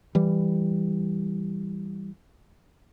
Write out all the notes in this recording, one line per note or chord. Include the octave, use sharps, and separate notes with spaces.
E3 G3